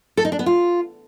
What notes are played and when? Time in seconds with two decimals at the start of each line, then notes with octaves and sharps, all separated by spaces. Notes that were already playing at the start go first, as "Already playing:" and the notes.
0.17 A4
0.25 D#4
0.32 D4
0.39 B3
0.46 F4